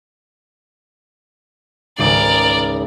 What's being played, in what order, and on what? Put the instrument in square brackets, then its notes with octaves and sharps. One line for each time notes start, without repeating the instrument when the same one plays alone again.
[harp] G#1 C#2 [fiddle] A#4 D5